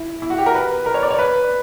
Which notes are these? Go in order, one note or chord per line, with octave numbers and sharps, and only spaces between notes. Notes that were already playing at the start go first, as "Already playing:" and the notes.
Already playing: E4
E4
F#4
G4
A#4
B4
A#4
C#5
D5
C#5
B4